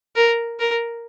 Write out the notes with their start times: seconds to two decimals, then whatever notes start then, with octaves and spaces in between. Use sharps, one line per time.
0.16 A#4
0.60 A#4